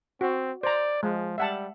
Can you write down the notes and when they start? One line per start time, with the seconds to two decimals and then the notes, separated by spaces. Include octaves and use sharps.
0.21 C4 F#4
0.63 C5 D5 A#5
1.03 F3 G#3
1.38 G3 E5 F#5 A5